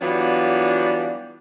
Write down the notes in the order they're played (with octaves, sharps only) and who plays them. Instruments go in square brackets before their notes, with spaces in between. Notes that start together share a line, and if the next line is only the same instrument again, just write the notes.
[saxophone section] E3 F#3 G3 B3 D4 F4